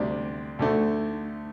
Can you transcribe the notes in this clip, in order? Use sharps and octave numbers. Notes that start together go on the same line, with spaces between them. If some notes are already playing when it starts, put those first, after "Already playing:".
Already playing: D2 C3 G3 D4
D2 D3 A3